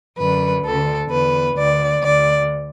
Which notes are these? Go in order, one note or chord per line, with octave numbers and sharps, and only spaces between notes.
F#2 D3 B4
D2 D3 A4
E2 D3 B4
D2 D3 D5
D2 D3 D5